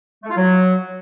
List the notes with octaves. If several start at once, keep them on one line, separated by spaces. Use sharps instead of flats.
A3
F4
F#3